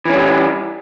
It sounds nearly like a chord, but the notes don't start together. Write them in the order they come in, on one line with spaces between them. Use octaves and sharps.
E3 C#4 G3